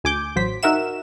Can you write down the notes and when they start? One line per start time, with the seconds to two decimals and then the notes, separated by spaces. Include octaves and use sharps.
0.04 D2 G#5 D6 G6
0.36 A1 F#3 C5 B6
0.63 D#4 F#4 A#4 E5 F#5 E7